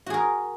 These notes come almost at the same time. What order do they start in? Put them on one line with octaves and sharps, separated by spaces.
F#4 G#4 A#4